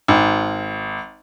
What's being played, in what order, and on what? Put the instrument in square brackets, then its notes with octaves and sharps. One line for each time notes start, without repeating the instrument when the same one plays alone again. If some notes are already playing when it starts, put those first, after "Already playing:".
[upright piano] G#1